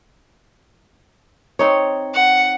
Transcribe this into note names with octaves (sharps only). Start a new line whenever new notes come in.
C4 D#4 C#5
F#5